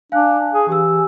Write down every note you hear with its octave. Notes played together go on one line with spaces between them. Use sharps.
D4 F5 G#5 F#6
G#4
E3 G4 G#5 E6